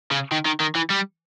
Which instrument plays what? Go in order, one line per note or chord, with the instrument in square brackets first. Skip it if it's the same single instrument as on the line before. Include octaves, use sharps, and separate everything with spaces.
[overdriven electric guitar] C#3
D#3
D#3
D#3
E3
G3